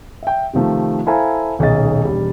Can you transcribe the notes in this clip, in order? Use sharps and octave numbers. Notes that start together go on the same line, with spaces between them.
E5 G5
C3 D#3 F3 A3
E4 A4 C5 F5 G#5 A#5
D#1 B1 G#4 D#5 A6
E1 G3